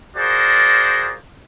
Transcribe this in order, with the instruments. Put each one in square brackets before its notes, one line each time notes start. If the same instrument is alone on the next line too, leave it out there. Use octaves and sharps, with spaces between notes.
[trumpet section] F4 F#4 G#4 A#4 C5 D5